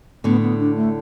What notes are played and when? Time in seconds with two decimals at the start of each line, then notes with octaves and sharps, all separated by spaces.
0.24 A2 D3 B3
0.42 B3
0.59 D4
0.76 A3